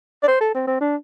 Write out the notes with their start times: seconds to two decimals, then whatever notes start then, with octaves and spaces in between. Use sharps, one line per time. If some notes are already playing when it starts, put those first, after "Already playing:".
0.23 D5
0.28 C5
0.40 A4
0.54 C4
0.67 C4
0.80 D4